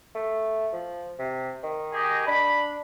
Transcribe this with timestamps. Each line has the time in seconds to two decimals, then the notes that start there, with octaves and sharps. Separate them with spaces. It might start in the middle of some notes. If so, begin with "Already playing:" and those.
0.15 A3
0.73 F3
1.19 C3
1.63 D#3
1.93 G4 G#4 D#5
2.27 D4 B5